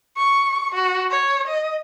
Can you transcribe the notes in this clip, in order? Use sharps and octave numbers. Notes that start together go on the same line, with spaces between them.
C#6
F#4
C#5
D#5